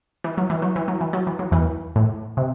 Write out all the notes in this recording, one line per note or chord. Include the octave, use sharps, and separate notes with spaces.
E3
F#3
E3
F#3
E3
F#3
E3
F#3
E3
F#3
E2 E3
A2
C3